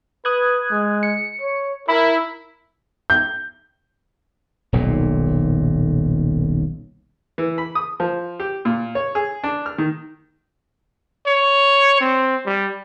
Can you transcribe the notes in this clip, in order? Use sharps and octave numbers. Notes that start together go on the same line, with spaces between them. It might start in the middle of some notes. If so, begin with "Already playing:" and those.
B4 D#6 F#6 G#6
G#3
C#7
C#5
E4 A#4 B5
G6
D#1 B1 A#2 D#3
E3
B5
D#6
F3
G4
A#2
C#5
G#4
D4
F6
D#3
C#5
C4
G3